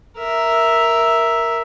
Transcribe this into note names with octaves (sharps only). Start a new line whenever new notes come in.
A#4 E5